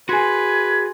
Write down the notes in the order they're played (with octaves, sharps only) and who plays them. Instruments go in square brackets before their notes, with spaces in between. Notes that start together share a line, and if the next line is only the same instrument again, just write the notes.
[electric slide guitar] F#4 G#4 [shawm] B4 [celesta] G#5 C6 [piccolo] G#6